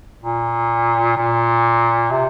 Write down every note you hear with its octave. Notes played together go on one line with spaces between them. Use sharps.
A#2
A#2
C3